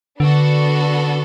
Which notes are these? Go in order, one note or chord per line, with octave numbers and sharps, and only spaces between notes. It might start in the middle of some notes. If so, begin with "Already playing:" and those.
D3 B3 D4 F#4 A4